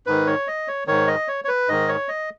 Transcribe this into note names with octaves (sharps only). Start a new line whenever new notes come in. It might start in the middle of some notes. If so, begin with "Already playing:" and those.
G#2 D#3 B4
C#5
D#5
C#5
G#2 D#3 C#5
D#5
C#5
C#5
B4
G#2 D#3 D#5
C#5
D#5